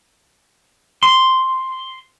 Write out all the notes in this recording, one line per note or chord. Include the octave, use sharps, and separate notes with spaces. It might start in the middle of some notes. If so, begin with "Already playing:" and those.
C6